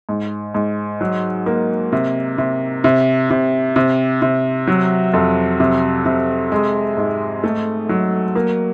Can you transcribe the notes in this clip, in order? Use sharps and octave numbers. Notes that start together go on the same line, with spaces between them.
G#2
G#2
F#3
A#3
C3
C3
C3
C3
C3
C3
F#3
F2
C3
C3
G#3
G#2
A3
F#3
A#3